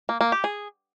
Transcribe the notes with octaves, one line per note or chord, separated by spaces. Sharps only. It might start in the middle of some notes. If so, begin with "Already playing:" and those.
A#3
A#3
G4
G#4